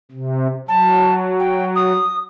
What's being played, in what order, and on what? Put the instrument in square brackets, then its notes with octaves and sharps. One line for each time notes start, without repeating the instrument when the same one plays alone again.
[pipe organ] C3
[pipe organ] F#3 [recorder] A5
[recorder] G5
D#6